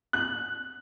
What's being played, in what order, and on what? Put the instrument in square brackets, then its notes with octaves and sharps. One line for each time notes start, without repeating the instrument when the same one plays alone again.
[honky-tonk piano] F#6